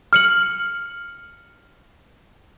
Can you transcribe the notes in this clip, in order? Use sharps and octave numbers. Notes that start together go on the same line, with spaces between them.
F6 C#7 F#7